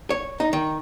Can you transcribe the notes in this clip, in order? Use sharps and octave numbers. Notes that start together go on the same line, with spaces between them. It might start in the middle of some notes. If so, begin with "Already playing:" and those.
C#5
D#4
D#3